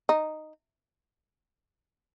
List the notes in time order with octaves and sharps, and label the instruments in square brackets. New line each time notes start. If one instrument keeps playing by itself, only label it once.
[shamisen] D#4